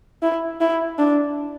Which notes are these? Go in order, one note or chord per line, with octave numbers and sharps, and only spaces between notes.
E4
E4
D4